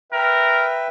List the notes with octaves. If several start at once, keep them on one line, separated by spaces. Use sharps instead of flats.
A#4 B4 E5 G5